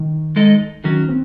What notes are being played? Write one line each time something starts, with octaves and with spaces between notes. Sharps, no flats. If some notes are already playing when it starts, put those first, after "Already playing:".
Already playing: D#3
G#3 D#4 A4 D#5
D#3 F#3 C#4 F#4
C4